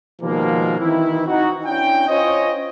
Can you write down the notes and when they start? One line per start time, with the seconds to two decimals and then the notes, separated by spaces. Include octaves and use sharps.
0.21 B2 D#3 F3 G3 G#3 A#3
0.78 D#3 E3 C4 E4
1.27 D#4 F#4
1.65 C#4 D4 E4 G5
2.08 C#4 F4 C5 C#5 D#5